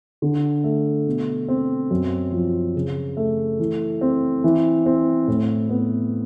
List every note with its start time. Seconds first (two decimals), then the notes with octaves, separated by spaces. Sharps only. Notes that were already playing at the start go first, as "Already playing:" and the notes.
0.22 D3
0.64 A3
1.07 B2
1.48 C4
1.91 F#2
2.32 F3
2.76 C#3
3.17 A3
3.60 E3
4.01 C4
4.44 E3
4.86 C4
5.28 A2
5.69 B3